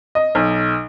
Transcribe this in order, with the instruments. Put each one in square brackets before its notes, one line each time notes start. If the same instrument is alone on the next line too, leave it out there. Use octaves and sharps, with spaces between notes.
[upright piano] D#5
B1